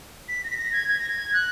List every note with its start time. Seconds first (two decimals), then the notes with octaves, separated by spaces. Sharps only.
0.28 B6
0.43 A#6
0.50 B6
0.57 A#6
0.72 G#6
0.88 G#6
0.99 A#6
1.09 G#6
1.33 F#6